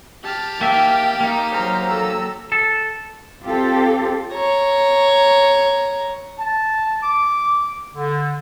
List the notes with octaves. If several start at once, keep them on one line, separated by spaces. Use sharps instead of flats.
G4 A5 F6
A#3 E5 G5
A#3 D#4
F#3 C5 A#5 F6
A4 E6
A4
C4 F4 G4 A4
C#5 A#5
A5
D6
D3